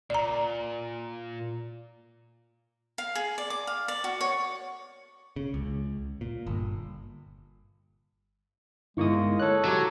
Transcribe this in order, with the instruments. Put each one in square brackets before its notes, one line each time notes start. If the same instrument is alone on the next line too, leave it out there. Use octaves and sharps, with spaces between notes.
[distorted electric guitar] A#2 [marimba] D5 A#5
[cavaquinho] F5
G#4
D5
D6
F5
D5
F#4
C#5
[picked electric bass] C#3
C#2
A#2
G1
[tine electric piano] G1 A#3 D#6 [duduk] G#3 [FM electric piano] D#4 E4 C#6
[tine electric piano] A4 F#6 [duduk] C#5
[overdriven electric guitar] F#3 [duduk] G4